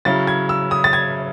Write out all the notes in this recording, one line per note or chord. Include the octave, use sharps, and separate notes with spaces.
C#3 F#3 C#4 E4 A6
G#6
E6
D#6
A6
G#6